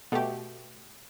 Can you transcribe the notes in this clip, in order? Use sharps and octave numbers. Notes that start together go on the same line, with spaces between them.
B2 A3 G4